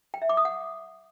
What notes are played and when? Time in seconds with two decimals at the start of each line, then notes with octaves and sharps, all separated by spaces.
0.14 G5
0.22 E5
0.29 D6
0.37 D#6
0.45 F#5